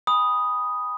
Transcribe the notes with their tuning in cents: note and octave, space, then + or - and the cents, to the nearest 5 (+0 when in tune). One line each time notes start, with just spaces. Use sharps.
G#5 -45 B5 +0 D#6 +0